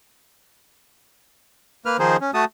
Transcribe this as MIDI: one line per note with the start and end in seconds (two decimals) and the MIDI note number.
1.86 1.97 58
1.86 1.97 71
1.86 1.97 89
1.99 2.17 51
1.99 2.17 53
1.99 2.17 63
1.99 2.17 68
1.99 2.17 72
2.21 2.31 61
2.34 2.45 57
2.34 2.45 66
2.34 2.45 81
2.34 2.45 87